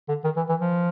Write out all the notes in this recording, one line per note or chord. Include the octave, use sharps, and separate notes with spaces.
D3
D#3
E3
E3
F3